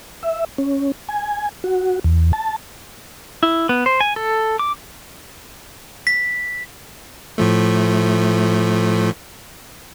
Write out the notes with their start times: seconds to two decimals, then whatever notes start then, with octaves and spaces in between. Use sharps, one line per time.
0.23 E5
0.58 C#4
1.09 G#5
1.64 F#4
2.04 E2
2.33 A5
3.43 E4
3.69 B3
3.86 C5
4.01 G#5
4.16 A4
4.59 D6
6.07 B6
7.38 A2 F3 A3